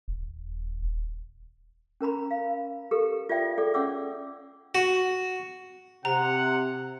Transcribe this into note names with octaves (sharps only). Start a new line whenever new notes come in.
D#1
C#4 A#4 A#5 B5
F5
G4 A4 A#4
F4 D5 E5 G5
G#4 A4 D5 G5
C#4 C#5 F#5 G5 D6 E6
F#4
C3 F#5 A#5